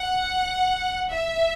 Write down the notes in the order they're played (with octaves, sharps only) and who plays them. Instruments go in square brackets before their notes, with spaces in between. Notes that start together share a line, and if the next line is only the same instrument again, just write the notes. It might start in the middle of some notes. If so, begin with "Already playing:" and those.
Already playing: [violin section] F#5
E5